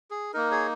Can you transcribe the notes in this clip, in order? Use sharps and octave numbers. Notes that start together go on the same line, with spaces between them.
G#4
A#3 D#4 A#4
G#4 C#5